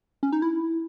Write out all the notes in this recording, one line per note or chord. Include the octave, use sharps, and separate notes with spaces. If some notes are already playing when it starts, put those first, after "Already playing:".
C#4
D#4
E4